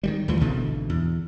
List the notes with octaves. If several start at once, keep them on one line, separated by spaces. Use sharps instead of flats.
D#3 E3 G3
D2 E3 F3
G#1 B2 D3 E3
E2